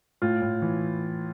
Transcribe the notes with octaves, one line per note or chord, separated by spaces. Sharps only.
A2 F4
A2
E3